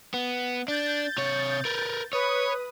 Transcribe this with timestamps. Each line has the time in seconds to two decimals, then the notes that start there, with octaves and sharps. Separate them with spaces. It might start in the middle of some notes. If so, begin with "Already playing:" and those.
0.14 B3
0.68 D4 G6 A6
1.18 C3 C#5
1.65 A#4 B4
2.13 B4 C#5 D#6